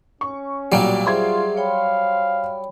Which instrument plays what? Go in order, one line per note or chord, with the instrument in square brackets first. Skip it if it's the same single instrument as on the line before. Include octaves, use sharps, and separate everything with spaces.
[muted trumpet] C#4 [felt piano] C#6
[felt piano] B1 A#2 D7 [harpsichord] F#3 G3
[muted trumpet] F4 [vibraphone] G#4 E5 [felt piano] C5 C6 G#6
[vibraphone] C#5 G5 B5 [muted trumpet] F5